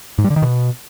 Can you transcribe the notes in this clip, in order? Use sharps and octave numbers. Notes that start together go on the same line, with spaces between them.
G#2
G3
D3
D#3
B2